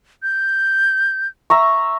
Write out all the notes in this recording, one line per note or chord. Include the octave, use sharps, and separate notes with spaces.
G6
E5 A#5 C#6